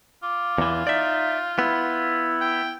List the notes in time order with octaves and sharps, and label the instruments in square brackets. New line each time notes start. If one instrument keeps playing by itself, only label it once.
[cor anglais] F4 [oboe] D6
[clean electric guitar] E2 E3
[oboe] D#4 [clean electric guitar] D5 E5
[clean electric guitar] B3 [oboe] E4
[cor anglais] G5